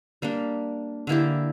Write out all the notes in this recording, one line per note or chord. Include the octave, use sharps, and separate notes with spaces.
G3 A#3 D4
D3 A#3 E4 G4